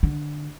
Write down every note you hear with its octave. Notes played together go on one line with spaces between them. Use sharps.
D3